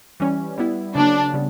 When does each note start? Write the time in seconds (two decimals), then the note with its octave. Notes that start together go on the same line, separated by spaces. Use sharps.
0.20 E3 G3 C#4
0.58 G3 B3 E4
0.95 C#3 F#3 A#3 D4
1.34 C#3 G3 B3